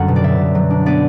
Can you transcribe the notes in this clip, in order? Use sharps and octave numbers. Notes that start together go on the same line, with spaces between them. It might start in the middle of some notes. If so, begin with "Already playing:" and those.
Already playing: F#2 D3 F#3 G3 F#5
B2
D5
B2 E5
B2
F#3
D4
B3 D5